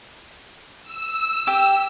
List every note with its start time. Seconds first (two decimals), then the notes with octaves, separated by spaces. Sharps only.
0.83 E6
1.47 G4